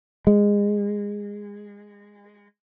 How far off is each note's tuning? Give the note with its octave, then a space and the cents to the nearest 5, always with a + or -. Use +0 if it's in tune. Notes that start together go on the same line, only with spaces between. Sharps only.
G#3 -20